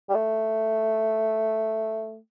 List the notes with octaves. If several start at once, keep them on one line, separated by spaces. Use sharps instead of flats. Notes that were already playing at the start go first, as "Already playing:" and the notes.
G3
A3